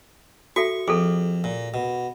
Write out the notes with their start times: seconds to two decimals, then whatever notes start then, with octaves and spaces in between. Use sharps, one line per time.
0.56 F#4 A4 E5 C#6
0.88 F2 G#4 A4
1.44 A#2
1.74 B2